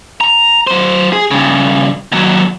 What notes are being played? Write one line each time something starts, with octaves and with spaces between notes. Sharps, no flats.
A#5
F#3 C5
G#4
G2 C#3
D#2 F#3